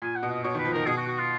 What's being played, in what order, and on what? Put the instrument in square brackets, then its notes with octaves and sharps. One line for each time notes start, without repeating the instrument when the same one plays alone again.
[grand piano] A#2 [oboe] G#5
[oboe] F#5
[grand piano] B2
[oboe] D#5
[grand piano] B2 [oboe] C#5
[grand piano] D#3 [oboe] B4
[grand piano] F3
[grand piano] D#3 [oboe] A#4
[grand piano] B2 [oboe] G#4
[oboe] F#4
F#4
F4